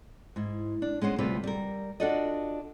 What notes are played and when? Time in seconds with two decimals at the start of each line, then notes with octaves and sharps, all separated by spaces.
0.36 G#2 E4
0.82 D4
1.02 G#3 B3 C#4 C5
1.18 D2 C3 G3 C4 F4 B4
1.44 G3 A#4
2.00 D4 F4 F#4 A4 D5 D#5